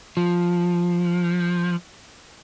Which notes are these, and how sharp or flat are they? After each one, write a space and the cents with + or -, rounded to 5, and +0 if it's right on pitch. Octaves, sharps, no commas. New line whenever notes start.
F3 +5